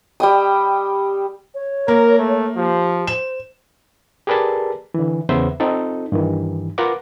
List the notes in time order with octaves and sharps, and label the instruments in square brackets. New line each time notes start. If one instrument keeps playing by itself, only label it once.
[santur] G3 G5 D#6
[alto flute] C#5
[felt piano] A#3 [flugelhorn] A#4
[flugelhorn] A3
[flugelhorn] F3 [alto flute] G4
[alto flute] C5 [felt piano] E7
[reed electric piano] G4 G#4 A#4 B4 D5 A5
D3 E3
E2 C#3 B3 C5 E5
C4 D#4 F4 A4
G2 D#3 E3
F4 A#4 B4 F5 F#5 D6